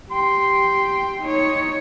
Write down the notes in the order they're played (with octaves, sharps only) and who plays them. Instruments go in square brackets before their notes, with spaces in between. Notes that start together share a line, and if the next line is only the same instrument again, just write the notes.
[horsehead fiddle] G4 G5 [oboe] C6
[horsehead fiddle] D#4 C#5